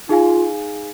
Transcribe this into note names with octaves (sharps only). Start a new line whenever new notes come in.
D#4 F4 G#4 F5 G#5